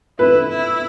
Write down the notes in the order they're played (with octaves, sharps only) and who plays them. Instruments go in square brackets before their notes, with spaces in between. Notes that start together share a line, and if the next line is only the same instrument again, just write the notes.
[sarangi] E4 [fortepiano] B4
[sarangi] E4